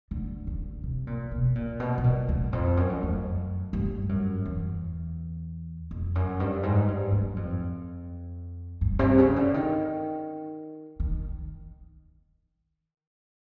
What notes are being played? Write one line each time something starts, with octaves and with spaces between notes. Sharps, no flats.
D3
D3
C3
A#2
B2
A#2
B2
B2
A#2
E2
F2
F#2
F2
F#2
G2
F#2
E2
F2
F#2
G2
G#2
G2
F#2
F2
G2
C3
C#3
D3
D#3
D#3